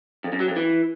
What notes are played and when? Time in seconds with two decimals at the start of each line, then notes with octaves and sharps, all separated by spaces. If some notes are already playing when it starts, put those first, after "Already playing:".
0.24 F2
0.32 F#2
0.40 F#3
0.48 F2
0.56 E3